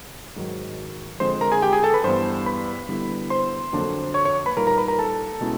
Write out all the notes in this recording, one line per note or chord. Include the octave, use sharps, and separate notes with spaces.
G#2 D#3 F#3
D3 F3 G#3 C4 C5 C6
A#4 A#5
G#4 G#5
G4 G5
G#4 G#5
A4 A5
B4 B5
G2 E3 G3 B3 C5 C6
B4 B5
D3 G3 B3 E4
C5 C6
F2 D3 F#3 A#3 D4
C#5 C#6
C#5 C#6
B4 B5
A#2 G3 A#3 D#4 A#4 A#5
A#4 A#5
B4 B5
A#4 A#5
A4 A5
B2 G#3 C#4 E4